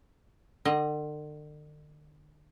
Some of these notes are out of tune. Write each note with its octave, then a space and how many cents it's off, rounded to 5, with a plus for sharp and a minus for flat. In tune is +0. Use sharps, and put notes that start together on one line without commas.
D3 +40 D#5 +0